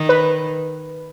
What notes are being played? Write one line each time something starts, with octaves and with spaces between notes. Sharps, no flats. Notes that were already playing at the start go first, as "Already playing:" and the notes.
Already playing: D#3
B4